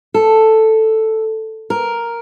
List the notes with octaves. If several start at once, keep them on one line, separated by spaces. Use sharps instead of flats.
A4
A#4